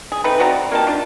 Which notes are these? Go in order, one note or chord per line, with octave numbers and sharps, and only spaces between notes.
G#4
A3 C4 D#4 B4
C4 F#4 D5 A#5
A#3 D#4 G4 A5
D4 F4